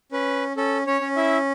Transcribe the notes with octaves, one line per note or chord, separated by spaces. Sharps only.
C#4 B4
C#4 A4
C#4 C#5
C#4
E4 E5